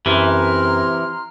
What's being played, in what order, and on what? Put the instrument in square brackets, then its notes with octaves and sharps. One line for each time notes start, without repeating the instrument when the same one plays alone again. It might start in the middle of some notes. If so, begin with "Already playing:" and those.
[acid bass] F#2 [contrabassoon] C3 [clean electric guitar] E3 [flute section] A#5 C6 F6